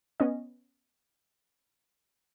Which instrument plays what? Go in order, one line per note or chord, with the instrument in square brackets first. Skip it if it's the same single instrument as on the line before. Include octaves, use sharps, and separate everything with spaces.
[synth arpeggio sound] B3 C#4 D#5